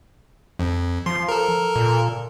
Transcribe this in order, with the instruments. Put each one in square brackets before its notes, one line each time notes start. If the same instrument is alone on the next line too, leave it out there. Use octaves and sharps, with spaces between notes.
[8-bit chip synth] F2
[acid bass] F3 [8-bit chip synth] C6
[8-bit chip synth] A4 A#4
[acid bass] A#2